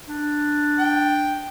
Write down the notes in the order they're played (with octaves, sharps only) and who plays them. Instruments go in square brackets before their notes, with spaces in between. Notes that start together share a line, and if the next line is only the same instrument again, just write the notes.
[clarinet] D4
[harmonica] G5